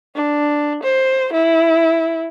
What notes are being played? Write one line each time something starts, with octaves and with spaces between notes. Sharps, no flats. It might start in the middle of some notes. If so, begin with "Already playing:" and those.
D4
C5
E4